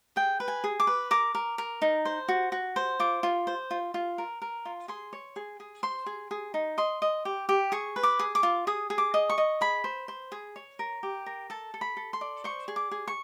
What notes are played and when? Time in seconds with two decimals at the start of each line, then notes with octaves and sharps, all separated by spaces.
0.16 G#4 G5
0.40 B4
0.48 G#5
0.64 G#4
0.80 D6
0.87 B4
1.11 A#4 D6
1.35 A#4
1.58 A#4
1.82 D#4
2.05 C5
2.28 F#4
2.52 F#4
2.76 C5
3.00 F4 D6
3.23 F4
3.47 C5
3.71 F4
3.94 F4
4.18 A#4
4.42 A#4
4.65 F4
4.88 G#4 C6
5.13 C#5
5.36 G#4
5.60 G#4
5.83 C5 C6
6.06 G#4
6.31 G#4
6.54 D#4
6.78 D#5 C6
7.02 D#5
7.25 G4
7.49 G4
7.72 G#4 C#6
7.96 B4
8.03 D6
8.19 G#4
8.35 D6
8.43 F4
8.67 G#4 D#6
8.90 G#4
8.98 D6
9.14 D#5
9.29 C#6
9.38 D#5
9.61 G#4 B5
9.84 C5
10.08 C5
10.32 G#4
10.56 C#5
10.79 A#4
11.03 G4
11.26 A#4
11.50 A4 A5
11.74 A4
11.81 B5
11.97 A4
12.13 C6
12.21 D5
12.44 C5 C#6
12.68 G#4
12.76 D6
12.91 G#4
13.07 C#6